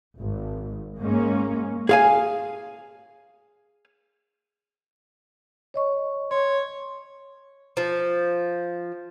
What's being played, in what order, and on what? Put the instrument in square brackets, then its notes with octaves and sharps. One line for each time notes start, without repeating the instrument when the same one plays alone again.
[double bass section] G#1
G#2 G#3 A#3 C#4
[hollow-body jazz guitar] G#4 F5 G#5
[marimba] C#5 D#5 C#6
[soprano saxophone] C#5 [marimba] C6
[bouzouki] F3